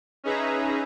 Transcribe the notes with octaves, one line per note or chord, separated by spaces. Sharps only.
C#4 D#4 G#4 B4 E5 A#5